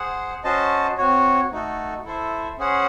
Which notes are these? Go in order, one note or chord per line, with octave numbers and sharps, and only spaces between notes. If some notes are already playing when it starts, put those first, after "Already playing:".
Already playing: G#4 C5 F#5
C#4 F#4 C5 D#5 A5
C4 F#4 C#5
A3 D#4 F#4 A4
E4 A4 C5 E5
C#4 G#4 C5 F#5